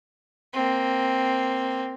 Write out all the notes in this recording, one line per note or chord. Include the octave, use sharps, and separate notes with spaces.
A#3 C4